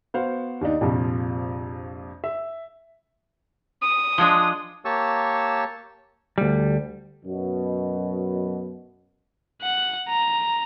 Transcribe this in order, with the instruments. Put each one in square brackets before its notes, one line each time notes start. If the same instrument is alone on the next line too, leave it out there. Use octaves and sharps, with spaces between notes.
[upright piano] B3 F#4 C5 F5 F#5
D#2 D4 D#4
A#1 F2 C3 F3
E5
[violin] D#6
[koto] F3 G#3 D4
[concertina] A#3 G4 C#5 A5 C#6 E6
[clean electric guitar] D2 G3
[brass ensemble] F#2 B2
[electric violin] F#5
A#5